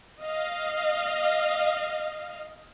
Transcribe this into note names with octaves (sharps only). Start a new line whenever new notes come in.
D#5 F5